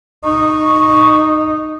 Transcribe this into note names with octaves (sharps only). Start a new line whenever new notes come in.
D#4 C#6